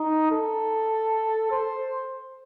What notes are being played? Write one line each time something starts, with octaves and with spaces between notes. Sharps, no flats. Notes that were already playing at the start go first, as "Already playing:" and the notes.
Already playing: D#4
A4
C5